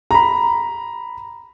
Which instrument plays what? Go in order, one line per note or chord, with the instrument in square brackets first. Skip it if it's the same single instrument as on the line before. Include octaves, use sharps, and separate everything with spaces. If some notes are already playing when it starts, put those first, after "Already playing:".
[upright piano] A#5 B5